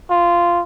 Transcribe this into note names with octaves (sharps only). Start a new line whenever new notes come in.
F4